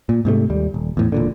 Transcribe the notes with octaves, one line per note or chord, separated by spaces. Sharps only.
A#2
G#2 C3 D#3 A3
D#2 G3
D#1
E2 A2
E1 A#2 D3